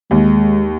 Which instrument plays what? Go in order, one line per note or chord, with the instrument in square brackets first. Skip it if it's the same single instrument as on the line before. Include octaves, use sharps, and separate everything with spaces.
[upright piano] D#2 [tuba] G#3